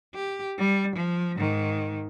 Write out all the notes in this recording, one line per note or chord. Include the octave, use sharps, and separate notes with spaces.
G4
G3
F3
G#2 D#3